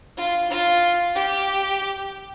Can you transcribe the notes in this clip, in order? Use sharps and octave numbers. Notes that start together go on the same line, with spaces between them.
F4
F4
G4